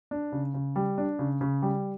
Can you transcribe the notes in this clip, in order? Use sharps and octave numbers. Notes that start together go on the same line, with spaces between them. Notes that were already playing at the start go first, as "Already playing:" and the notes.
D4
C#3
C#3
G3
D4
C#3
C#3
G3